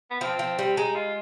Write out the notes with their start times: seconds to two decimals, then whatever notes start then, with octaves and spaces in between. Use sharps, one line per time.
0.11 B3
0.21 F3 C4
0.39 F3
0.59 G3
0.77 G#3 D#4
0.96 F4